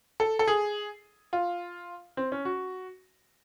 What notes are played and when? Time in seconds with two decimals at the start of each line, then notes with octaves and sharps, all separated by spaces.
0.20 A4
0.39 A4
0.47 G#4
1.33 F4
2.17 C4
2.32 C#4
2.45 F#4